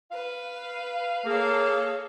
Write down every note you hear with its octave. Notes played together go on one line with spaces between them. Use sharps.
B4 F5
A#3 G#4 A4 C#5